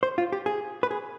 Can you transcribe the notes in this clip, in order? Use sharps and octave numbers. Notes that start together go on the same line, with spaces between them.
C5
F4
G4
G#4
B4
G#4